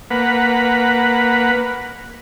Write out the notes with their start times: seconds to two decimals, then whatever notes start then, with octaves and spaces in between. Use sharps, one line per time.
0.11 A#3 B4 F#5